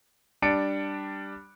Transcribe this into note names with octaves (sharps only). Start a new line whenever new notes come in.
G3 D4 A6 C#7 D7